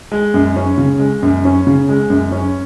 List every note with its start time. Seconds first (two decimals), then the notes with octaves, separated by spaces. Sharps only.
0.12 G#3
0.34 F#2
0.56 C#4
0.78 C#3
1.00 G#3
1.23 F#2
1.45 C#4
1.67 C#3
1.89 G#3
2.10 F#2
2.32 C#4